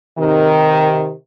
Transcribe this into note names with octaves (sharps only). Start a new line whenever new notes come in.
C3 D#3